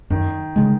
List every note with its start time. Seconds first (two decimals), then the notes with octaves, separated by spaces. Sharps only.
0.10 F#2 D#3
0.56 C#3 G#3